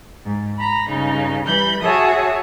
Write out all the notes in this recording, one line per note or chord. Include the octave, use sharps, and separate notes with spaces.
G#2
A#5 B5
G2 C#3 D#4
E3 G3 B5 G6
F#4 G#4 C#5 E5 A5 D#6